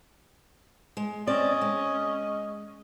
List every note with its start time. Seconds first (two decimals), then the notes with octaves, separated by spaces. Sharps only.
0.97 G#3
1.27 C4 C#4 D5 D#5
1.61 G#3